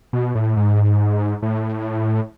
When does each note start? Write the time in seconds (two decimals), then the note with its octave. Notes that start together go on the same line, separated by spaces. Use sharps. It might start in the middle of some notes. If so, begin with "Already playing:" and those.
0.13 B2
0.35 A2
0.57 G#2
1.42 A2